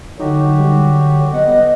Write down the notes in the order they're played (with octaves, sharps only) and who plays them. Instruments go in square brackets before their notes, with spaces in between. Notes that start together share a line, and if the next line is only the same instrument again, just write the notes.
[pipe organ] D3 F#3 [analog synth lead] D#4 [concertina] F#4 G4
[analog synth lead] G3
[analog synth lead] B3 [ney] D#5 [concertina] F#5